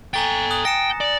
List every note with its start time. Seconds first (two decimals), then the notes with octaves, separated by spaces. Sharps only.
0.14 A4 G5 G#5 A#5 A6
0.51 D#6 F#6
0.65 G5 A#6 C#7 E7
1.01 D5